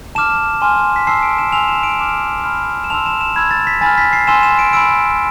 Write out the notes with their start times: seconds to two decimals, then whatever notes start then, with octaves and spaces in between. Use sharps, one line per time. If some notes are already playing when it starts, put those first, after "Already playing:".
0.15 A5 D6 F6 E7
0.62 G#5 C6 F6
0.96 B6
1.07 A5 C6 E6 C7
1.23 D7
1.38 E7
1.52 G#5 C6 E6 F7
1.68 E7
1.83 D7
1.99 A5 D6 F6 E7
2.44 B5 F6
2.84 E7
2.90 A5 C6 E6 F7
3.06 E7
3.21 E7
3.36 B5 E6 G#6
3.51 A6
3.67 B6
3.81 G#5 B5 F6 A6
3.98 B6
4.13 C7
4.27 G#5 C6 E6 E7
4.43 E7
4.59 D7
4.73 B5 E6 D7